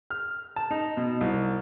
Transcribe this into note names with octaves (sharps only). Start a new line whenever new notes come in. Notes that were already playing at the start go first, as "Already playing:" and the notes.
F6
A5
D#4
B2
C2